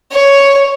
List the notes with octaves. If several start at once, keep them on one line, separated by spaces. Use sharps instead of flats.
C#5